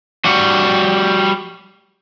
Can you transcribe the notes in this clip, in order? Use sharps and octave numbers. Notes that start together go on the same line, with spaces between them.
G3 F#4